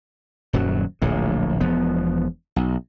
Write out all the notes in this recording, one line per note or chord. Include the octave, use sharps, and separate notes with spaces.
D#1 F#2 F#3
D1 A#1 A2
E1 F3 B3
B1